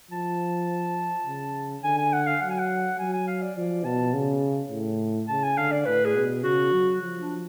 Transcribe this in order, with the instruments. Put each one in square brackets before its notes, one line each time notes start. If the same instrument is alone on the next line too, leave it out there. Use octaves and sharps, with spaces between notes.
[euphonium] F3 [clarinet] A5
[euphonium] C#3
[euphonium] D3 [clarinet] G#5
[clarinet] G#5
F#5
F5
[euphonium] F#3 [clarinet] F#5
[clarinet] G#5
F#5
[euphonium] F#3 [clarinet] G#5
[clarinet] G#5
F5
D5
[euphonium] F3 [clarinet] D5
[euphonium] B2 [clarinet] A5
[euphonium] C#3
A2
[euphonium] C#3 [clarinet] A5
[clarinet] G#5
[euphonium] D3 [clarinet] F5
[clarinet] D5
[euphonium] A2 [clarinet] B4
[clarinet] G#4
[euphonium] B2
[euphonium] C#3 [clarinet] F#4
[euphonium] F#3
F3
[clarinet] D4